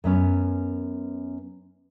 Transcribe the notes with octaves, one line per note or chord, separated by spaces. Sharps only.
F#2 B3 C#4